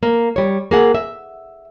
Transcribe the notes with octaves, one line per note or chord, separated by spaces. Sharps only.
A#3
G3 C#5
A#3 G#4 F#5
E5